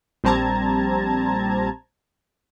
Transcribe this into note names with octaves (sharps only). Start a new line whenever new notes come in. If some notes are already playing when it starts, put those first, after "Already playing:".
A#1 G3 C4 A5 A#5 G#6